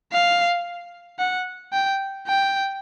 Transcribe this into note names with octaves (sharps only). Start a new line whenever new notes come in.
F5
F#5
G5
G5